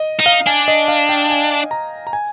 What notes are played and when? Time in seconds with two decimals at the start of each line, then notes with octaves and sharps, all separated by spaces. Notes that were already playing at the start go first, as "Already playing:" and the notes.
Already playing: D#5
0.20 D#4
0.26 F5
0.47 D4 G#5
0.68 D#5
0.88 F5
1.09 G5
1.30 G#5
1.71 A#5
2.07 A#5
2.13 G#5